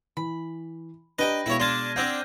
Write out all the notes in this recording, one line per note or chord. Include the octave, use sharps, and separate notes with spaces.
E3 B5
D4 G4 B4 D#5 G5 A#5 A#6
B2 G#3 E4 C#5 F5
D4 A5 C6 F6 G#6 D#7
C4 D4 F#5 E6 G6 A#6